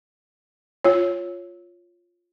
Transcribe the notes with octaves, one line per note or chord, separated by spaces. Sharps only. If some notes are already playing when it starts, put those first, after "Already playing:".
F4 C#5